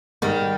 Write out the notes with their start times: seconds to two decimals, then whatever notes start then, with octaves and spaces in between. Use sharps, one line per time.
0.22 G#2 D#3 G3